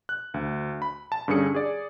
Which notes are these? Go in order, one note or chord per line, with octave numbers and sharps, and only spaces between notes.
F#6
D2
B5
A5
G2 D3 C#4 G#4 C#7
G#4 D5